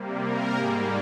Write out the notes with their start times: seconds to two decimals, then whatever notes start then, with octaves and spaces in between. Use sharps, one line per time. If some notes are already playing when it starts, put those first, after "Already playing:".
Already playing: C3 G3 A#3
0.23 A#4
0.56 G#2 G3 A#3 G#4